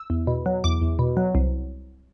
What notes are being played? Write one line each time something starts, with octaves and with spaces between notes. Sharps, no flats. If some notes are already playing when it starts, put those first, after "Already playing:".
Already playing: E6
E2
B2
F#3
E2 D6
E2
B2
F#3
C2